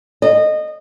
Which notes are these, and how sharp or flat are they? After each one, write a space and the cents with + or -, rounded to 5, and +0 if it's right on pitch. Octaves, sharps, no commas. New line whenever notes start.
D#5 -20